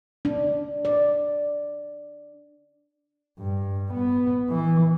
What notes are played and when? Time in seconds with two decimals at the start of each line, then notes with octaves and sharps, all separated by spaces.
0.25 D4
0.85 D5
3.39 G2
3.93 B3
4.49 E3